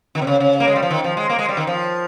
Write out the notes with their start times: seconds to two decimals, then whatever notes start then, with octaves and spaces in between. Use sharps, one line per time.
0.15 D#3
0.22 C3
0.27 C#3
0.40 C#3
0.60 A#3
0.68 G#3
0.76 G3
0.82 F3
0.91 D#3
1.04 F3
1.17 G#3
1.30 A#3
1.39 G#3
1.49 G3
1.57 D#3
1.67 F3